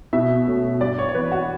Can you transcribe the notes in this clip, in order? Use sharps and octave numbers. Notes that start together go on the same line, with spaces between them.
B2 E5
A3 C#4
G2 D5
C#5
C#5
E3 B3 B4
F#4